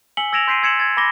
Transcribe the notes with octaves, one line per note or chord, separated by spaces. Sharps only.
G#5 E6 B6 C#7 F#7 G7
E6 G#6 A#6 D7 E7 F7
C6 G6 B6 C7 D7 D#7
E6 G#6 C#7 E7 F#7
G#6 A6 B6
B5 D6 A#6 G7